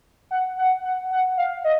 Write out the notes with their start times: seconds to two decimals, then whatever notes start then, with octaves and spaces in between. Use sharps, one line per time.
0.31 F#5
0.58 F#5
0.85 F#5
1.12 F#5
1.37 F5
1.64 D#5